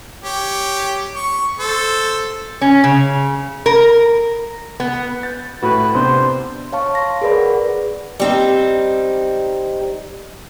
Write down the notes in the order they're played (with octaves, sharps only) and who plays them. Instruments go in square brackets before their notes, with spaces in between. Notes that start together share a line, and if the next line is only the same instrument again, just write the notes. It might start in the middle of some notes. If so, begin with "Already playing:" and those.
[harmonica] G4 C#5
C#6
A4 C5
[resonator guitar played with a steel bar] C#4
C#3
A#4
B3
[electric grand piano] G6 A6
[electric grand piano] A2 F#4 [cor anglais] B4
[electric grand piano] C3 B3 D4 [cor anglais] C5
[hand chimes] C#5 F5 A5 C#6
C6 A#6
G#4 A#4 B4 D5 B5
F#5
[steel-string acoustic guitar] G3 C4 D#4